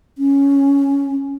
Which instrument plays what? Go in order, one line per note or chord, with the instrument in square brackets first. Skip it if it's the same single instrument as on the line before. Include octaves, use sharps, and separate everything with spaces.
[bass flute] C#4